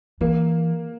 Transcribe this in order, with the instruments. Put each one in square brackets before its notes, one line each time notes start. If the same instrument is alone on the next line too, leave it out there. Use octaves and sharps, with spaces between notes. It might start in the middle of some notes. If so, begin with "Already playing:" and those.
[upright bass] E3 [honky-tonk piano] A#3